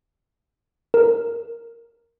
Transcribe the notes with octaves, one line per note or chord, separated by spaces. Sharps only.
A#4